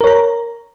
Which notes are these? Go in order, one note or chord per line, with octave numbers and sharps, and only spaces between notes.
A#4 C#5 A#5